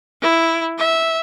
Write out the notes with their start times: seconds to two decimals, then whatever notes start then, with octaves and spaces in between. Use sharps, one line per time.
0.22 E4
0.78 E5